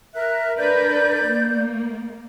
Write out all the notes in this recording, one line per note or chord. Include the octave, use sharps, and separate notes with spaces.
A#4 E5 F#6
D4 A#4 B4 D5 G6
A#3